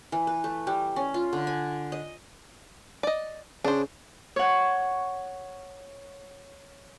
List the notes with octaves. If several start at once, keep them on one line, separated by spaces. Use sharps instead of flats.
E3
B4
A3
G3
C#4
F4
D3
G#5
D#5
D5 D#5
C#3 D4 C5
C#5 F#5